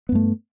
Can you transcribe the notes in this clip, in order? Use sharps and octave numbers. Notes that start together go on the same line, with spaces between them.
G2 A3 B3